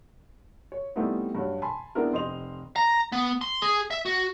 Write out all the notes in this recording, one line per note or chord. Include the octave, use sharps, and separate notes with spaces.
C#5
G3 A3 B3 C4 D#4 E4
G2 F#3
G#5 A5 B5 C6
G#3 B3 C4 D4 E4 A#4
F1 C5 D#5 C6 F7
A#5
B3
C6
G#4
E5
F#4